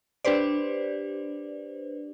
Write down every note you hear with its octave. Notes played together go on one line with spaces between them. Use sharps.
D4 G4 B4 C5 D5